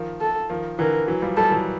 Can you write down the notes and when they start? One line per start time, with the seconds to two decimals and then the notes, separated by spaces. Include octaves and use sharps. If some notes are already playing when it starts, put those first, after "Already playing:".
Already playing: D#3 F3
0.21 A4
0.50 D#3 F3
0.79 D3 E3 A#4
1.08 E3 F#3
1.22 F3 G3
1.37 F3 G3 A4
1.51 E3 F#3